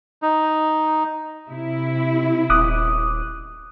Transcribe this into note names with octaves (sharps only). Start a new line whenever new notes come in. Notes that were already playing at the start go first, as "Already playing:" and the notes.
D#4
C3 E4
D#1 D6 D#6 F#6